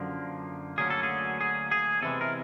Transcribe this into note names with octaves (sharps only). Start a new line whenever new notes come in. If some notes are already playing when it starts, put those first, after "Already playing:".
Already playing: F#2 D3 F3 A#3
D2 D3 F#3 A#3 C#4 G#4
A4
G#4
G#4
G#4
E2 C3 E3 G#3 A4
A#4